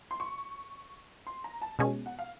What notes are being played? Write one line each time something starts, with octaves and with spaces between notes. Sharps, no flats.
C6
C#6
C6
A#5
A5
B2 G#3 C#4 G#5
F#5
F5